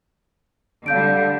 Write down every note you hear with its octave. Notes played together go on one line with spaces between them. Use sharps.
D3 G3 F5 G6 D7